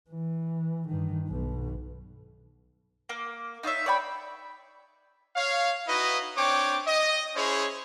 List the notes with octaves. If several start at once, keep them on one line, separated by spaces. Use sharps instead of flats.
E3
G2 D#3
B1 B2
A#3
D#4 F4 C#5 E5
C#5 D5 G5 B5
C#5 F5
D#4 E4 F#4 B4 D#5
C4 D4 C#5 G5 D6
D#5
C#4 E4 G#4 C5 C#5